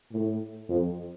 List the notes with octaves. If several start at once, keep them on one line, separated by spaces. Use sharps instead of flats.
A2
F2